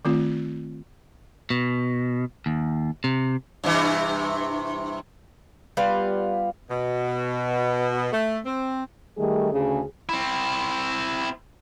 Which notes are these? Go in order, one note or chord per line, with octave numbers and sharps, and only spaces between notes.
D#3 A3 C4 F4
B2
D#2
C3
G2 C3 E3
G3 B3 F4 B4
B2
A3
C4
D#3 G3 A3 G#4
D2 C#3 G#4
C4 E4